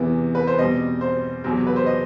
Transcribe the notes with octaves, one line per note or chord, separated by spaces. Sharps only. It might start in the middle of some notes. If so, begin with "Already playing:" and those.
Already playing: E2 C3 E3 B3
B4
C5
E2 B2 G3 C4 D#5
C5
E2 C3 F#3 C4
B4
C5
D#5